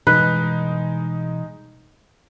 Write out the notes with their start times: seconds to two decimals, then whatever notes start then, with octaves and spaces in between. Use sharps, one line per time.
0.07 B2 E3 G3 G#3 D#4 B4